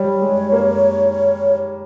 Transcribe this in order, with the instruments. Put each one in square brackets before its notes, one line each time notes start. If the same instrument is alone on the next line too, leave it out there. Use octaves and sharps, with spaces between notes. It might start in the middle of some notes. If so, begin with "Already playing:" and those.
Already playing: [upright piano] G3 [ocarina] C#5
[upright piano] G#3
A#3